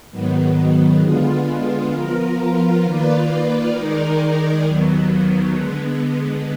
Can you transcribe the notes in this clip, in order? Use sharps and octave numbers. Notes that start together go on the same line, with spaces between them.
G#2 D#3 F#3 B3
D3 G#3 B3 F4
F3 B3 F4 A#4
D#3 A#3 F4 B4 D5
D#3 G#3 D#4 A#4 D5
D#2 D#3 F#3 B3
D3 G#3 B3